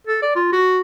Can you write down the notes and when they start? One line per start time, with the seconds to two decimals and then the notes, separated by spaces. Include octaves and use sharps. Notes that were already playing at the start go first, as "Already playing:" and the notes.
0.07 A4
0.22 D5
0.36 F4
0.52 F#4